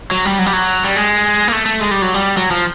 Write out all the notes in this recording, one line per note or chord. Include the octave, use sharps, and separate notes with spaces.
F#3
G3
F#3
G3
F#3
G3
G#3
A#3
A3
A3
G#3
G3
F#3
G3
F#3
F3